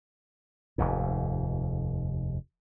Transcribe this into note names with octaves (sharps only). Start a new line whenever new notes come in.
F1 D#2 G#2